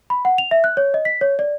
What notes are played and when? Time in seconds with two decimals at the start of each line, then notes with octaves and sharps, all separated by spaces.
0.10 B5
0.25 F#5
0.38 F7
0.51 E5
0.64 F#6
0.77 C#5
0.94 D#5
1.05 B6
1.21 C#5
1.39 D5